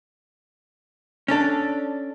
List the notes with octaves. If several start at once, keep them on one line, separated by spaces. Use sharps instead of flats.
C#4 D4 A4